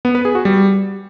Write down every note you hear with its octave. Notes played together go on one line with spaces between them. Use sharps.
B3
B4
G#4
F#4
G3